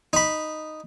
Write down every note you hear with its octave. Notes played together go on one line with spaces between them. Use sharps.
D#4 B5